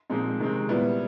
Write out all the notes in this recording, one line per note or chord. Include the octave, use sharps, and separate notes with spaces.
A#2 F3 G#3 C4 D#4
C3 D#3 G#3 C4
A#2 G3 B3 E4